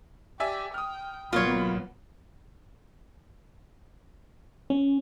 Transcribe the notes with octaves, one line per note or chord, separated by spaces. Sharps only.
G4 D5 E5 G#5
G5 D#6 F6
G#1 B2 F#3 A#3 B3 F4 C#5 B5
C#4